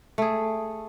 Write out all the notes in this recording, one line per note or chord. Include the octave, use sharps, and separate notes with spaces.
A3 G#4